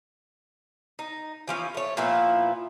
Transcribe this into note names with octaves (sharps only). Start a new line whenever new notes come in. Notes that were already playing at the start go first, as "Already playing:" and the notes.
D#4
E3 F3 C#4
A3 C#5
A#2 F3 B3 E4